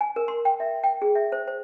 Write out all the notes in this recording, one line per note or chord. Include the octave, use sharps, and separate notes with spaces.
G#5
A#4
C6
G5
E5
G5
G#4
E5
C5
C5